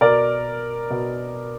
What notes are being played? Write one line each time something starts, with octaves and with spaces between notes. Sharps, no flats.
B2 A#4 D5
B2